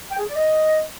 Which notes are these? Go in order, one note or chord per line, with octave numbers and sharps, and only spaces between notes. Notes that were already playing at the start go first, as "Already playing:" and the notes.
G5
G#4
D5
D#5